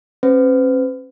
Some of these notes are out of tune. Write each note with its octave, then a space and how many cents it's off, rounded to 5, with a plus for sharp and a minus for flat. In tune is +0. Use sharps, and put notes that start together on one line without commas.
C#4 -45 B4 +45